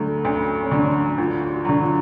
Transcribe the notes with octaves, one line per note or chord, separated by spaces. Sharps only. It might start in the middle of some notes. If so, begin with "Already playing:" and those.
Already playing: D2 D3 F#3 A3
D2 C#4
C#4
D3 F#3 D4
D2 F4
F#4
D3 F#3
F4